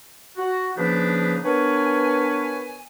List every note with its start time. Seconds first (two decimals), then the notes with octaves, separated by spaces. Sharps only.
0.37 F#4
0.77 C#3 F3 A#3 D4 D#4 B4
1.45 B3 D4 A#4 B4 C#5 G#5